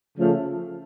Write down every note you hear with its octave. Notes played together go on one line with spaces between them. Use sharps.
C#3 F3 A3